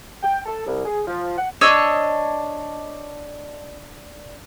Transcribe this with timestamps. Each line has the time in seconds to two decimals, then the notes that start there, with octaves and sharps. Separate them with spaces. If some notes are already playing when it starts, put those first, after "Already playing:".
0.22 G5
0.46 A4
0.66 C2
0.85 G#4
1.06 F3
1.38 F#5
1.61 D4 C#5 D#5 E6